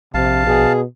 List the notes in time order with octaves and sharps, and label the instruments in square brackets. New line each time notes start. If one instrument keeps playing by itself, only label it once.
[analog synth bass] A#1 [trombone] C3 [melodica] F5 A5
[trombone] B2 [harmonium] G#4